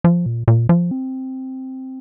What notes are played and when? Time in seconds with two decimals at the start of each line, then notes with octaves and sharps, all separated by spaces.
0.04 F3
0.26 A#2
0.48 A#2
0.69 F3
0.91 C4